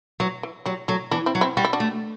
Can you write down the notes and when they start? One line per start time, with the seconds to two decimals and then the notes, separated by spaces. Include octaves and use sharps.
0.20 E3 F#3
0.43 E3
0.66 F#3 G3
0.88 F#3 A3
1.11 E3 B3 D4
1.26 C4 E4
1.35 F#3
1.41 C4 E4
1.57 G3 F#4
1.65 E4
1.73 D4 F#4
1.80 A3